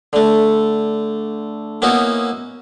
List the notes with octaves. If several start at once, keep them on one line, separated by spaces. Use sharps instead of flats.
D3 A3
A#3 B3 C#4 D#4 E4 F#4